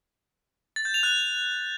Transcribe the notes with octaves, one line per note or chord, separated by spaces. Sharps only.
A6
G6
F7
F#6